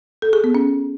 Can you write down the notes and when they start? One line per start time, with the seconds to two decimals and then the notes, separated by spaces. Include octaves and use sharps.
0.22 A4
0.33 G#4
0.44 B3
0.55 C#4